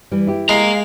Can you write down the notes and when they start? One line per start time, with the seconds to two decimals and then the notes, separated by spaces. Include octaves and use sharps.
0.11 E3 G3
0.27 E4 G4
0.49 G#3 F5 A#5